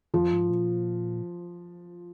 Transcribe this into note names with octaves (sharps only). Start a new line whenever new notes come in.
F2 F3
G#2
A#2